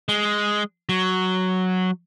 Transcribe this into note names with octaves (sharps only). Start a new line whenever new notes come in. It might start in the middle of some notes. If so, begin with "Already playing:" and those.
G#3
F#3